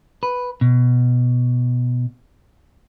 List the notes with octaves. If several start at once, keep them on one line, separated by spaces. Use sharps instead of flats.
B4
B2